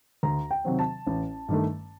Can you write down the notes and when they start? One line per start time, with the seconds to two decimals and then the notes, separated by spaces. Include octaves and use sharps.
0.23 D2 A#5
0.51 G5
0.65 C3 D#3 F#3 C4
0.79 A5
1.07 A1
1.49 G2 D#3 A3